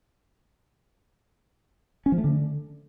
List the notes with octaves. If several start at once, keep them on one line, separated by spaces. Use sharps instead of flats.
C#4
F3
A3
D3